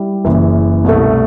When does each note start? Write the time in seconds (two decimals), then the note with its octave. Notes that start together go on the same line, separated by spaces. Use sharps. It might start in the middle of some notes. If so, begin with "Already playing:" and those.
Already playing: G3 E4
0.25 F#1 F#2 E3
0.84 C2 B2 A3